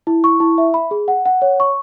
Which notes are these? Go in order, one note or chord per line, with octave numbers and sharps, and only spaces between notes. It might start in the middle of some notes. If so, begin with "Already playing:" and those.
E4
C#6
E4
E5
B5
G#4
F#5
F#5
C#5
C#6